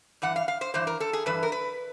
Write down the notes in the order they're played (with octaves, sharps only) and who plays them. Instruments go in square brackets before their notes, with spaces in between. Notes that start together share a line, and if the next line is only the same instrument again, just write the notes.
[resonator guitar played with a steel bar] G2 E3 F#5
F5
F5
C5
G2 E3 C5
A#4
A4
G#4
G2 E3 B4
A#4
B4